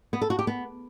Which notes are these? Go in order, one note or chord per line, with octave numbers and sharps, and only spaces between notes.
B3
A4
F#4
G4
B3